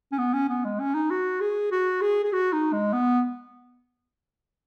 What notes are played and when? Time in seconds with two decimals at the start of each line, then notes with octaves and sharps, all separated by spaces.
0.12 C#4
0.18 B3
0.33 C#4
0.49 B3
0.65 G#3
0.80 C#4
0.95 D#4
1.11 F#4
1.41 G#4
1.71 F#4
2.01 G#4
2.24 G#4
2.33 F#4
2.53 D#4
2.73 G#3
2.93 B3